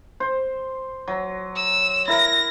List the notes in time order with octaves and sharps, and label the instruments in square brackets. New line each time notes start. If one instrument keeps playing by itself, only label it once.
[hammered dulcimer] C5
F#3
[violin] E6
[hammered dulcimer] E4 A#4 [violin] A#6